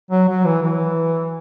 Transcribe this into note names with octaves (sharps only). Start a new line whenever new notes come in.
F#3
F#3
E3
E3